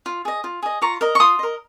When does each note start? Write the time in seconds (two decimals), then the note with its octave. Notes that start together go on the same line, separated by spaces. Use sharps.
0.06 F4
0.25 G#4 D#5
0.44 F4
0.62 G#4 D#5
0.82 F4 A#5 C#6
1.01 A#4 D#5
1.15 C#6
1.20 F4 C6 D#6
1.39 A#4 D#5